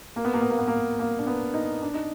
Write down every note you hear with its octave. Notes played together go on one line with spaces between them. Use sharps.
A#3
B3
A#3
B3
A#3
B3
A#3
A#3
D4
B3
D#4
D4
D#4